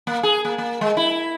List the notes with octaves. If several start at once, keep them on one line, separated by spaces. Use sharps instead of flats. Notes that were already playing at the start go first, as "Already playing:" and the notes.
A#3
G#4
A#3
A#3
G#3
E4